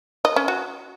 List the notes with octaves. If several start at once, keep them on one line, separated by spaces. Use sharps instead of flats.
D#5
C#4
F#4